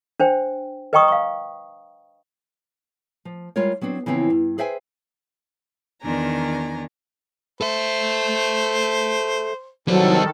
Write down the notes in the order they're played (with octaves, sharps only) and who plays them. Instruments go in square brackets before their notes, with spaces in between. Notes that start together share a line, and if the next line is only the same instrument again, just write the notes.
[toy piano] D4 C5 G5
B4 D#5 G5 A#5 C#6 D#6
F5 C#6
[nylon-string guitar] F3
G3 G#3 F4 A#4 C#5
F#3 B3 C4 D4
C#3 E3 F3 B3 C4
G2
G#4 B4 C5 E5 G5 G#5
[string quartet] E2 D#3 D4 G#5 A#5
[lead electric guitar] A4 E5 [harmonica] C5
[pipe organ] D#3 A4 [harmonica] E3 [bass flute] F#3 [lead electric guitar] G3 C5